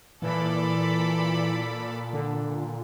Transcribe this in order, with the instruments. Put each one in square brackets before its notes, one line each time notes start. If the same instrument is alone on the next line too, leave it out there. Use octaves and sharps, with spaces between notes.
[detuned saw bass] A#2 [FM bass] E3 [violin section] A4 D5 B5
[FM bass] D3